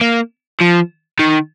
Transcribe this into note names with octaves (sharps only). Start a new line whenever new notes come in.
A#3
F3
D#3